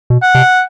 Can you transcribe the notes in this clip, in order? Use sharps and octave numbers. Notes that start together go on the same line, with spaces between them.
B2
F#5
C3